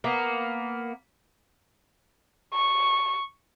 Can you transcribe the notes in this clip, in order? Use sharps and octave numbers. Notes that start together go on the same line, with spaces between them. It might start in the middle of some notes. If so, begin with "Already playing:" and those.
A#3 B3
C#6